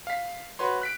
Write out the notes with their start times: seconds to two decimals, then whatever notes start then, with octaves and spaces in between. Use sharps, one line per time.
0.07 F5 B6
0.59 F#4 B4 C#5 C6
0.82 F#6 B6 D7